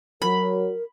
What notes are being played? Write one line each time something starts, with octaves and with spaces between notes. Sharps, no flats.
F#3 A#4 B5